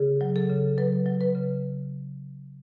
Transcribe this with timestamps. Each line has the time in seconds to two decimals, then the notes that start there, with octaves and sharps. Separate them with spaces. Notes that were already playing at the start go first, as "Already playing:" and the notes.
Already playing: C#3 G#4
0.21 F#3
0.36 A4
0.49 C#3
0.78 F#3 B4
1.06 F#3
1.21 B4
1.35 C#3